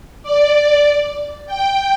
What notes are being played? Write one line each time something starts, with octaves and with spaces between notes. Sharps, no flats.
D5
G5